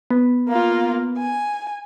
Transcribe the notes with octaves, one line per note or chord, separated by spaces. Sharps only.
B3
A#3 F4
G#5